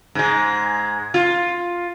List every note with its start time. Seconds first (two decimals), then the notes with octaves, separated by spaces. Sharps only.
0.15 G#2 G#3
1.14 F4